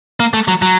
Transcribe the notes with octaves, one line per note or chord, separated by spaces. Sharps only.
A#3
A3
F#3
F#3